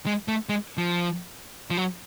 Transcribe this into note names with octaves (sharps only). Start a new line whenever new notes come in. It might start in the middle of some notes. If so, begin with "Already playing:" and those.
G#3
A3
G#3
F3
F3
F#3